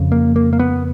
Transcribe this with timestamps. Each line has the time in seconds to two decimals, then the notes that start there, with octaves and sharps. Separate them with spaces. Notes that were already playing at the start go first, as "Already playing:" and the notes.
Already playing: F2 C#3
0.12 A#3
0.36 A#3
0.53 A#3
0.59 B3